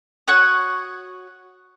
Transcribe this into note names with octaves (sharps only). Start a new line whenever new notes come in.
F#4 C#5 F#5 D#6